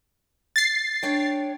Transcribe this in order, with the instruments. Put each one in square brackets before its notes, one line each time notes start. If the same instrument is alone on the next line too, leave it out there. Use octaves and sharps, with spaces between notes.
[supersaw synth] A6 C7
[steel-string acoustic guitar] D4 C#5 G5